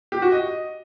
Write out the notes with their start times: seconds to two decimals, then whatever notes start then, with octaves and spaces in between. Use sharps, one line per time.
0.12 G4
0.22 F#4
0.32 D#5